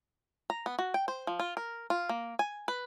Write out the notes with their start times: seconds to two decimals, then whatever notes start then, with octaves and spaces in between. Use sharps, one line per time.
0.50 A#5
0.66 B3
0.79 F#4
0.94 G5
1.08 C5
1.27 F3
1.40 F4
1.57 A#4
1.90 F4
2.09 A#3
2.39 G#5
2.68 B4